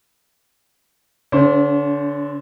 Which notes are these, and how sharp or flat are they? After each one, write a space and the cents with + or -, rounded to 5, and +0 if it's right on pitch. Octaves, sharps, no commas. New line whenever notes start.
D3 -15 C#4 +45 C5 +0